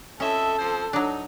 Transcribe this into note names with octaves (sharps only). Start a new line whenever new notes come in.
F2 C#4 A4 D#5 E5
F2 F3 C5
F#3 D4 D#4